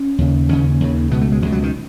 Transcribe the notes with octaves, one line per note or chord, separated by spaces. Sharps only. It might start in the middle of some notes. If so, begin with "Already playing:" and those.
Already playing: C#4
D#2 C#3
D#2 C#3 C#4
D#2 C#3
C#2 B2 B3
A3
G#3
C#2 B2 G#3
F#3
D#3